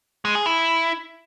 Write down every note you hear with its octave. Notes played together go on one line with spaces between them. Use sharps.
G#3
G#4
E4